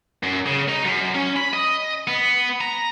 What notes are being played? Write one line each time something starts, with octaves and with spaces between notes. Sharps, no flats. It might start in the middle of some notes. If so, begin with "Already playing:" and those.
F#2
C#3
D#4
F#2
C#4
B5
D#5
B3
A#5